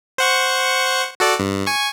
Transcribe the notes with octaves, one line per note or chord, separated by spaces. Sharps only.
C5 F#5 C#6
F#4 A4 D5
G2
G#5 C#6